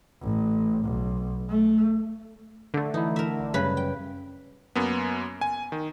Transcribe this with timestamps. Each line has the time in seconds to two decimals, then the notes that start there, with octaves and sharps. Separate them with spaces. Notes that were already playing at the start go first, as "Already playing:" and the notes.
0.21 A1
0.84 B1
1.49 A3
2.74 D3 A3
2.94 E3 D#4 E4
3.16 A#4 E5
3.40 A1
3.54 G#1 F#2 C#3 G3 B4 B5
3.77 G5
4.76 F#2 A#3 B3
5.41 G#5
5.72 D#3